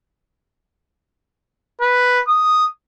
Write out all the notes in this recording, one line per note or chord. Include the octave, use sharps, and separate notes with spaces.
B4
D#6